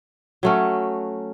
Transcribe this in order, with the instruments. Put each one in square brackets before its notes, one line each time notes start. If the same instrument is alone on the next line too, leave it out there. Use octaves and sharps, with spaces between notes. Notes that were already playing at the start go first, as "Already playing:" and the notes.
[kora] F#3 A3 C#4